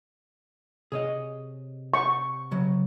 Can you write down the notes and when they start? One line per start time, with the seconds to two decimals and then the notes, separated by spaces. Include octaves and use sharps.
0.92 C3 G#4 C#5 D#5
1.94 C#6
2.51 C#3 F#3